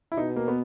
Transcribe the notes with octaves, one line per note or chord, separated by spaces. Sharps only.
E4
B2 D#4
A#3
B3